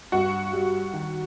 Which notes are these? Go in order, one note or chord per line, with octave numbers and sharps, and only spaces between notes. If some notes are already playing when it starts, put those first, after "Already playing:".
G2 F#4
G3
D#3